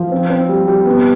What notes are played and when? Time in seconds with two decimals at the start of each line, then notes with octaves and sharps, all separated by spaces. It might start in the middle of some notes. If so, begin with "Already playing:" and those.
Already playing: F3
0.12 C4
0.30 C4
0.49 G3
0.68 G3
0.86 B3